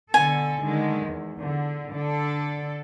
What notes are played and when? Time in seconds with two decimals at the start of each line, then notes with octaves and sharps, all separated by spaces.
0.14 B2 D3 A4 G#5
0.63 D3 D#3 G#3
1.05 E2
1.41 D3
1.91 D3 D4 A4